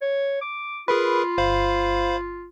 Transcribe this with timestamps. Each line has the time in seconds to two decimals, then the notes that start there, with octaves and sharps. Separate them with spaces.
0.02 C#5
0.42 D6
0.88 F4 G#4 A#4 B4 B5
1.38 G1 C5 F5 B5